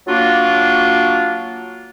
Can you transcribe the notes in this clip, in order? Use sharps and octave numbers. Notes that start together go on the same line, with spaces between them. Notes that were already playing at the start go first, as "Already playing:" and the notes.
F#3 A#3 D4 F4 F#4